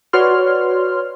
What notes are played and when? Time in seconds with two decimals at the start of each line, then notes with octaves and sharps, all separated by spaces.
0.13 F#4 B4 C#5 D5 C6 F6